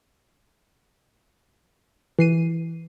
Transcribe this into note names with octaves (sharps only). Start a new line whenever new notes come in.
E3 C7 D#7